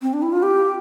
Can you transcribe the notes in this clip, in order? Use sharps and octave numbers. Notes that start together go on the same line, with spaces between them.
C4
D4
E4
F4
G4